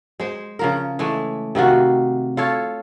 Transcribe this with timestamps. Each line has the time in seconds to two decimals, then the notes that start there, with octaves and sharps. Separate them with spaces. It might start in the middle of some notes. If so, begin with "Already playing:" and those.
0.20 G#3 C5
0.59 C#3 F3 A#4
0.99 E3 G#3 A3
1.55 C3 D#3 F4 F#4
2.37 F4 A4 C#5